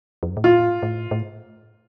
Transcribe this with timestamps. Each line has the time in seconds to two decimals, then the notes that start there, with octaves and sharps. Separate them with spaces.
0.23 F2
0.30 F#2
0.37 A2
0.44 A#2 F4
0.64 A2
0.83 A2
1.11 A2